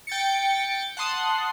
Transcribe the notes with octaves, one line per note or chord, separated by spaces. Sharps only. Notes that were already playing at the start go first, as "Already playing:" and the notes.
G5 A6 C#7
F#5 A5 C6 D#6 C7